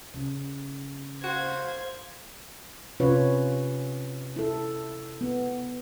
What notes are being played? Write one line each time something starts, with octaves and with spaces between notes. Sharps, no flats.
C#3
F#4 C5 F5 G#6
C3 C#4 F4 B4 C#5
E4 A4
B3